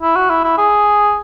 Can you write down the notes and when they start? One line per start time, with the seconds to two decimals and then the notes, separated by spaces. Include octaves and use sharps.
0.02 E4
0.16 F#4
0.30 E4
0.44 E4
0.58 G#4